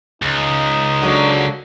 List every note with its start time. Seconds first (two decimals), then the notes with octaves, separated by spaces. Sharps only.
0.22 C#2 D#4
1.01 D3 F#3 A#3 D4 F#4